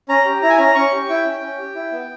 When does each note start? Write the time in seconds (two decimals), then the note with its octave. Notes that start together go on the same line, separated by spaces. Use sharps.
0.09 C#4 A#5
0.25 G4
0.42 E4 A#5
0.50 G#5
0.58 C#4 A#5
0.75 C#4 C#6
0.92 G4
1.09 E4 G5
1.25 C#4
1.42 C#4
1.59 G4
1.75 E4
1.92 B3